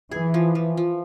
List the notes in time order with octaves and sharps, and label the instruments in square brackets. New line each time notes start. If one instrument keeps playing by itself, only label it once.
[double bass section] E3 [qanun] G#4
[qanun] F3
F3
F3